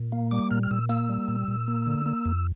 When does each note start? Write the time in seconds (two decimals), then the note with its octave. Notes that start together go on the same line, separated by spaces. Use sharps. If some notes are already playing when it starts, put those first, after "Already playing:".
Already playing: A#2
0.12 A#3
0.31 G3 D6
0.51 A#2 F6
0.63 F6
0.71 A#2 E6
0.89 A#3 E6
1.09 G3
1.28 A#2
1.48 A#2
1.68 A#3
1.87 D3
2.06 A#3
2.25 F2